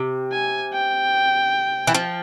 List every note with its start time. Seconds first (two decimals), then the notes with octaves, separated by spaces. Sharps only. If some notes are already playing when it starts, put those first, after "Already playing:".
Already playing: C3
0.33 G#5
0.73 G5
1.87 E3
1.94 F3